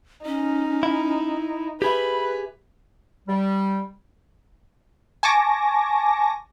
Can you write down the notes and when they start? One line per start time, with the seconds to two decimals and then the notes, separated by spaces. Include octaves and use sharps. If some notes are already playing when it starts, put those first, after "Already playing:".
0.26 C#4 D#4
0.83 E4
1.82 G4 G#4 B4 E5 B5
3.27 G3
5.23 G#5 A5 C#6 D6 A#6